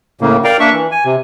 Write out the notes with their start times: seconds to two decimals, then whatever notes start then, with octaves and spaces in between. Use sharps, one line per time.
0.21 A2 C#3 A#3
0.44 A#4 D5 F5 G5 A#5
0.60 A#3 D4 E5 C#6
0.73 E3
0.92 G#5
1.05 C3